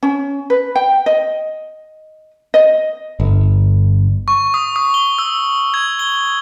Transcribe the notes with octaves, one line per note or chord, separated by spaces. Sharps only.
C#4
B4
G5
D#5
D#5
G1
C#6
D#6
D#6
G7
E6
G#6
G7